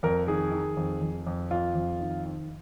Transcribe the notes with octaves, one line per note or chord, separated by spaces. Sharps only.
F2 A#4
D#3 G#4
D#3
F2
F2
F2
F2 F4
F2
D#3
D#3